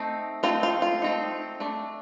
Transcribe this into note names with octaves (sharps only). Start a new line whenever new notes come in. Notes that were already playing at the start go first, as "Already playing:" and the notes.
Already playing: A3 C4 D#4
A3 C4 D#4 F4
F4
F4
A3 C4 D#4
A3 D4